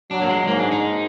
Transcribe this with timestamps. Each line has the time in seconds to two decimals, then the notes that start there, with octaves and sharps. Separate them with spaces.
0.11 F#3 D4
0.21 A#3
0.29 G#3
0.47 G#2 A#3
0.59 D4
0.71 D#4